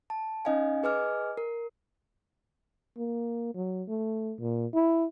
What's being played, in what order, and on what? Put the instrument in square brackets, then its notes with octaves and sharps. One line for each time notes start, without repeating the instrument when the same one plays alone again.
[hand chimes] A5
C#4 D#4 D#5 F5 G#5
G#4 B4 D#5 G#5 D6 F6
A#4
[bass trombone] A#3
F#3
A3
A#2
E4